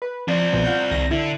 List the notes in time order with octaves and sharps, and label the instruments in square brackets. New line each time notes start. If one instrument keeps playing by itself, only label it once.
[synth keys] B4
[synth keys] F3 [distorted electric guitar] C4 D5
[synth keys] B1 B2 F3
F4 F#5 G6
C2 D#3 A#6
[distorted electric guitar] D3 [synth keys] E4